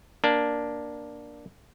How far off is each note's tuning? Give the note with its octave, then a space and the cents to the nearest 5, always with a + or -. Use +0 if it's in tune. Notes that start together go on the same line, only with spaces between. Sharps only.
A#3 +15 D4 +0